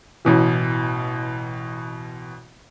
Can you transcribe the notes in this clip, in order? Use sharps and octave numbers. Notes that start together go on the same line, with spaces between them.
A1 B2 E3